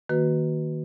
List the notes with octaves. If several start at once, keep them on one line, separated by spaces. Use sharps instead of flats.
D#3 A#3 F#4 B4